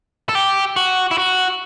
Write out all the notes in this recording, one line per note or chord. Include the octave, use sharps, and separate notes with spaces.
A4
G4
F#4
E4
F#4